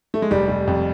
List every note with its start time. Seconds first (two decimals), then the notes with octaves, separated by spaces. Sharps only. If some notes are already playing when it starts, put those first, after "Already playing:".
0.14 A3
0.22 G#3
0.31 F1 G3
0.48 F1
0.67 F2